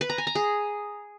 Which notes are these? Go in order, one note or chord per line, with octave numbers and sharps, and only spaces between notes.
B4
A#5
G#5
A#5
G#4